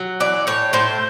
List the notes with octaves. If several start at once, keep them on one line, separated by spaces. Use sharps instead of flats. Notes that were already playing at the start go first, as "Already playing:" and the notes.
Already playing: F#3
E3 D5
A2 C#5
A2 C5